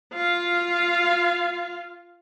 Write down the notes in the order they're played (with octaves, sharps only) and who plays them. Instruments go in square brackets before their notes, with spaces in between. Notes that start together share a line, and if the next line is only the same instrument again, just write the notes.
[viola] F4 F5